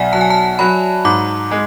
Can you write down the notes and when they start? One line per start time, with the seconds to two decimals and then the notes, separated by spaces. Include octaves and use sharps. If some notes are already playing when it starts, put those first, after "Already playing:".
Already playing: B1 D5 E5 G#5
0.13 F#3 A5
0.21 G#5
0.30 A5
0.59 F#3 B5
1.05 G#2 D6
1.51 G#3